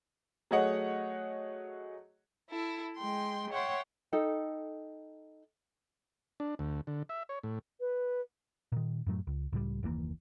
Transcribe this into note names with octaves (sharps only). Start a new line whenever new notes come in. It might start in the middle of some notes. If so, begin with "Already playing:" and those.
F#3 A3 G#4 C#5 D#5 F#5
E4 A4
G#3 G5 C6
C#5 E5 F#5 G5 C6
D#4 A4 G5
D4
D2
D3
E5
C#5
A2
B4
A#2 D#3
F#2 A2 F#3 A3
C#2
C#2 A2 F3 G3
F#1 D#2 E3 A#3